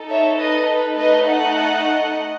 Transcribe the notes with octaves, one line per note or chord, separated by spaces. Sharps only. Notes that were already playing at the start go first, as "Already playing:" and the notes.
Already playing: D#4 A4
C#5 E5
B4 D#5
B4
A3 D#4 A4 B4 D#5
D#5 F#5